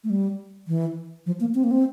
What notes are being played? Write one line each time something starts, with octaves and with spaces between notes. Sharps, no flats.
A3
G3
E3
F3
A#3
C4
A#3
C4